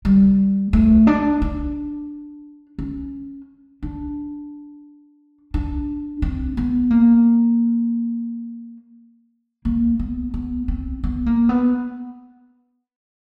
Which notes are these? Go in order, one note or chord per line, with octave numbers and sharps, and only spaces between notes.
G3
A3
D4
D4
C#4
D4
D4
C4
B3
A#3
A#3
B3
B3
C4
B3
A#3
B3